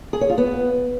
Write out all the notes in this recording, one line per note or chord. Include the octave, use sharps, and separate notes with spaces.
G#4
C#5
F4
B3